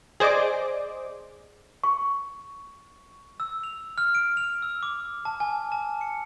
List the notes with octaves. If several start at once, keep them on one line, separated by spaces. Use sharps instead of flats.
G#4 C5 D5 D#5 D6
C#6
E6
F7
F6
D7
F7
E6
D6
A5
G#5
A5
C#7